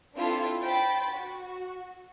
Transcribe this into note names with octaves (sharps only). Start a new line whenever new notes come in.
C4 D4 E4 F4 A4
C5 G5 B5 A6
F#4